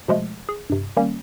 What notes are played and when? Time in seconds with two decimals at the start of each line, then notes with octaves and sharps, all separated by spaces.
0.08 B2 F3 G#3 A3
0.49 G#4
0.70 G2 C3
0.97 D#3 G3 A#3 C#4